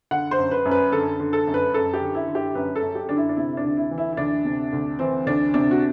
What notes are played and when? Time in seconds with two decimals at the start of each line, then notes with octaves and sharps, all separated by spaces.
0.11 D3 F#5
0.31 C5
0.38 F#2
0.51 B4
0.65 F#2
0.71 B4
0.92 D3 A4
1.20 D3
1.33 A4
1.47 F#2
1.54 B4
1.73 F#2 A4
1.93 G4
2.01 D3
2.15 E4
2.28 D3
2.35 G4
2.55 F#2 B4
2.76 A4
2.82 F#2
2.95 G4
3.09 D3 D4
3.17 E4
3.29 D4
3.37 C3 E4
3.57 D4
3.64 D2
3.77 E4
3.91 E3
3.98 E4
4.13 E4
4.17 D2 D4
4.45 C3
4.73 D2
4.99 E3 C4
5.26 D2 D4
5.54 C3 D4
5.71 F#4